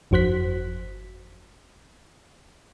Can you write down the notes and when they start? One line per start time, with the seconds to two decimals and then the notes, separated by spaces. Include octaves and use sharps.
0.11 G1 F2 F#4 C5 F#6 B6